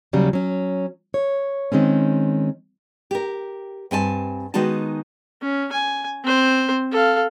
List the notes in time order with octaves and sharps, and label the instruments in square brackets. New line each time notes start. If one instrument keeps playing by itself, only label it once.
[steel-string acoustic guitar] D#2 C#3 F#3 G3
F#3 C#4
C#5
D#3 G#3 C4 C#4
[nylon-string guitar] G4 A#4
G2 C4 G#5 A5
D#3 G#3 B3 D#4 F#4 A5
[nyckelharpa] C#4
G#5
C4 C5
A4 F5